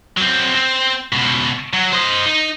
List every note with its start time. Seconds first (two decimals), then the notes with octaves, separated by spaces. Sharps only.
0.17 F#3 C4
0.55 C4
1.13 C#2 B2
1.73 F#3
1.92 C5 D#5
2.26 D#4